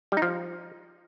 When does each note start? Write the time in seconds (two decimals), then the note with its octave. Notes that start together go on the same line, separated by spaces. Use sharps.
0.12 G3
0.17 D#4
0.22 F3